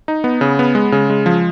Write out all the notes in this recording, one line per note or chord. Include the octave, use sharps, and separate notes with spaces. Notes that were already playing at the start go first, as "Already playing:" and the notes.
D#4
B3
C#3
B3
G#3
C#3
G#3
F3